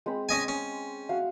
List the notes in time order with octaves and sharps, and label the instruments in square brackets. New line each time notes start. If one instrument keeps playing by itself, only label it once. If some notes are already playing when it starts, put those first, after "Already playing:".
[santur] G#3 C4 B5
[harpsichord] C#4 D#5 G#5
C#4
[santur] F#4 E5 F5